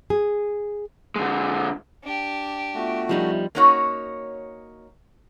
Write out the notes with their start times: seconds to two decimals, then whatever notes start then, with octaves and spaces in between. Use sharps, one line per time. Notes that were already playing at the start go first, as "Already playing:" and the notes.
0.10 G#4
1.16 D3 G#3
2.04 D4 G4
2.75 A3 B3 F4 F#4 E5
3.09 F3 G3 D#4
3.55 A#3 C#4 D#4 F#4 C#5